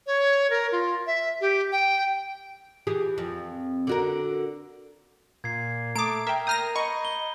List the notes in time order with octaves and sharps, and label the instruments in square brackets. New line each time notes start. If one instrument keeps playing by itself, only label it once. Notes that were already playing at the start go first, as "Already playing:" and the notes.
[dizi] C#5
A#4
F4
E5
G4
G5
[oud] E3 G4 G#4
F2
D3 F#4 A#4
[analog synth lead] A#2 [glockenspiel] G#6 C7
[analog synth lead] A3 [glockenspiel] A#5 D#6 [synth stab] D6 D7
[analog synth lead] A#4 [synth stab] E5 G5
[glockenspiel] A#5 G6 D#7 [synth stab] D#6 F6 A#6
[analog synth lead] D#5 [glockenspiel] B5 D#7 [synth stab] C#6
[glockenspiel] G7